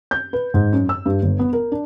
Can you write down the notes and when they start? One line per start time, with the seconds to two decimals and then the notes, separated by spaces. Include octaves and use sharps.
0.11 G6
0.33 B4
0.54 G#2
0.72 F#2
0.89 E6
1.06 G2
1.23 G1
1.39 B3
1.53 A#4
1.72 D4